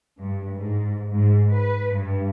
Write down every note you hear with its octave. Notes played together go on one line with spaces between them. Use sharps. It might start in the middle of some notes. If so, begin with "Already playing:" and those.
G2
G#2
G#2
B4
G2